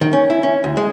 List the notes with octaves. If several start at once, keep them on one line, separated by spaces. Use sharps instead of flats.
D#3
C#4
E4
C#4
D2
G#3